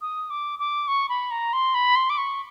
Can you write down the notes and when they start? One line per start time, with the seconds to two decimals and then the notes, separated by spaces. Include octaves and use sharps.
0.01 D#6
0.30 D6
0.59 D6
0.88 C#6
1.09 B5
1.31 A#5
1.53 C6
1.74 B5
1.96 C6
2.10 D6
2.18 C#6